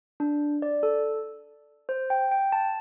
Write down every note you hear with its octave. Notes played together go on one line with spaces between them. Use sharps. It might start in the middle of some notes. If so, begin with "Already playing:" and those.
D4
D5
A4
C5
G5
G5
A5